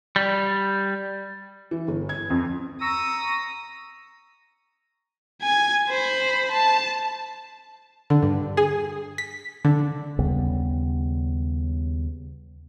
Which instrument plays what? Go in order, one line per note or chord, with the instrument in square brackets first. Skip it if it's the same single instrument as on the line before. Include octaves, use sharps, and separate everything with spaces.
[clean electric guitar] G3
[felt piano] E3
G1
G#6
F2
[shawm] A#5 [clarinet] C#6 [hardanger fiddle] D#6 [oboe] E6
[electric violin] G#5 G#6
C5 B5
A5
[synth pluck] D3
G2
G#4
B6
D3
[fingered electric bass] D#2 C#3 G3 B3